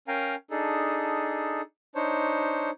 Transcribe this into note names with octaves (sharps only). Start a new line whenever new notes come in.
C#4 A#4 F5 G5 G#5 A#5
D4 D#4 G#4 A4
D4 D#4 C5 C#5